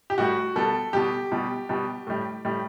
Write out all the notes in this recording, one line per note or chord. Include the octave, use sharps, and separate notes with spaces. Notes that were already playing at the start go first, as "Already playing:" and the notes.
G4
A2 G3 F#4
B2 G3 A4
B2 G3 G4
B2 G3
B2 G3
A2 G3
A2 G3